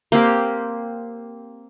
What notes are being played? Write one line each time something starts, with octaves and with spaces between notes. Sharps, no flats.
A#3 C4 G4